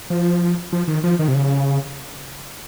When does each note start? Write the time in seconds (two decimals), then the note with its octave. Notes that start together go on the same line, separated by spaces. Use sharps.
0.10 F3
0.72 F3
0.88 D#3
1.04 F3
1.19 D#3
1.28 C3
1.35 C#3